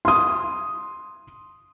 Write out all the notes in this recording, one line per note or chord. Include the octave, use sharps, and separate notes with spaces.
C6 D#6